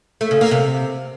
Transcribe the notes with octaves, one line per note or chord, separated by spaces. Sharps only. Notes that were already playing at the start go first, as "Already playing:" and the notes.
A3
C#3
A#3
C3